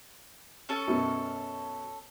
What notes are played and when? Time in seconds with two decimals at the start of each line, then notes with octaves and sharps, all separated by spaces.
0.69 C#4 A4 A5
0.88 F#2 B2